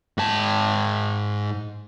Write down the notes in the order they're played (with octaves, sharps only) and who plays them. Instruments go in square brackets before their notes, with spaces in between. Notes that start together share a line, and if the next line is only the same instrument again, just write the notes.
[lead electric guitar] G#2 A5